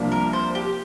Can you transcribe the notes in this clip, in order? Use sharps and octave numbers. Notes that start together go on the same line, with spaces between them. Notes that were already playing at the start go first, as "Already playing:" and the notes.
Already playing: C2 C3 F3 A#3 D4
A#4
C5
G4